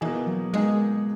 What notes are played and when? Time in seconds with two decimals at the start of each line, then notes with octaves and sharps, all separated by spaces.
0.01 B2 E3 A#3 D#4 G#4
0.27 F#3
0.53 B2 G#3 A#3 D#4 G#4